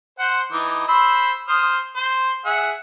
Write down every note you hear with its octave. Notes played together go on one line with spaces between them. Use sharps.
C5 F#5
E3 D#4 D6
C5 B5 E6
C5 D#6 F6
C5
G#4 E5 F#5